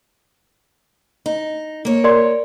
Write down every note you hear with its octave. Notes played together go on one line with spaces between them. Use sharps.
D#4
A#3 C#5
A#4 D5 C6